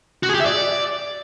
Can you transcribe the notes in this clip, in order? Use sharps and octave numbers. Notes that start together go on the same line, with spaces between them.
F#4
G#4
G4
E5
D5